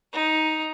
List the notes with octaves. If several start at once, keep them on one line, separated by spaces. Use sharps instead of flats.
D#4